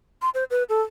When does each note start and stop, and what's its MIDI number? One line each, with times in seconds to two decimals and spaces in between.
0.22 0.30 84
0.34 0.44 72
0.51 0.63 71
0.69 0.81 69